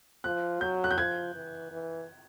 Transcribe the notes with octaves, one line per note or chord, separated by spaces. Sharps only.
F3 F#6
F#3 G6
F#6
G6
F3 G#6
E3
E3